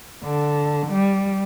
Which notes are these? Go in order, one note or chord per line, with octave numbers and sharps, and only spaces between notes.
D3
G3